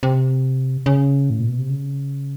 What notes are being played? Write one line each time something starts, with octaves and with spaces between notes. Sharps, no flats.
C3
C#3
A2
A#2
B2
C3
C#3